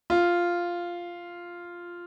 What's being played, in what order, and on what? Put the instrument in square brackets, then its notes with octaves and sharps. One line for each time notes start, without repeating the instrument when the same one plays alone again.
[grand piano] F4